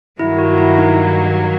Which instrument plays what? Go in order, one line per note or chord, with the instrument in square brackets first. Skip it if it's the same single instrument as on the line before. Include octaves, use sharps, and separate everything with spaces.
[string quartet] G2 D#3 F#3 A#3 [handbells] E4
[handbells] F#4
E4
D#4